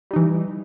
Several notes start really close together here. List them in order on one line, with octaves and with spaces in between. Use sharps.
G3 D#4 E3